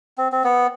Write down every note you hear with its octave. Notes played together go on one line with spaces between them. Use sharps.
C4
C4
B3